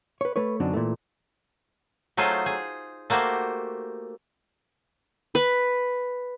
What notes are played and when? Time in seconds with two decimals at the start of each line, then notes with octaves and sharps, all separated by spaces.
0.21 B4 C#5
0.36 A3 B4 C#5
0.60 F#2 D3 F#3 C4 D4 D#4
0.73 A#2 E3 A3
2.17 F#3 A3 D#4 F4 G#4 C5
2.46 G#4
3.10 A3 A#3 F#4 G4 C5
5.35 B4